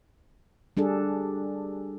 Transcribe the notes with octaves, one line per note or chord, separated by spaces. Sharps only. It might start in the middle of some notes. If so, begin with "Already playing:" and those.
G3 D4 G#4 A4